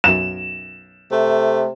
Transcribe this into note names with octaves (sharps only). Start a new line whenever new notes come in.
B1 F#2 E7
C3 A3